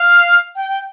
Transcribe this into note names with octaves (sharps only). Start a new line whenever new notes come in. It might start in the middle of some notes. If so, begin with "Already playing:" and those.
Already playing: F5
G5
G5